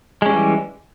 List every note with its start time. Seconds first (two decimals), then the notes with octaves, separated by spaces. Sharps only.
0.22 G#3
0.26 C#4
0.29 G3
0.33 E3